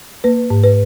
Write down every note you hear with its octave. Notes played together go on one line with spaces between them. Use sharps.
A#3 B4
G#2
B4